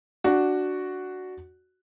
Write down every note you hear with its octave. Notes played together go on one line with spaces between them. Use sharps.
D4 F#4